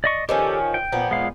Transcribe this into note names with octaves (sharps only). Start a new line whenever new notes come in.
D5 D#5 C#6
D#3 F3 C#4 G4 A4
G5
A#2 F3 B3
G#3 F5